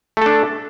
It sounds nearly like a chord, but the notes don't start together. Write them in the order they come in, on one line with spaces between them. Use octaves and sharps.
A3 A4 D4